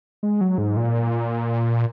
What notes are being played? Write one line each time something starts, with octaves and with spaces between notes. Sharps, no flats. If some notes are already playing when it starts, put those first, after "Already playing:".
G#3
F#3
G#2
A#2